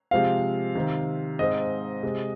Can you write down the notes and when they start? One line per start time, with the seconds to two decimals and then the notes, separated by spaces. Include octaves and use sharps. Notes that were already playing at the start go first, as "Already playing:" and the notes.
0.11 C3 F3 G#3 C4 F5
0.75 C3 D#3 C4
1.39 G#2 G#3 C4 D#5
2.03 C3 G#3 C4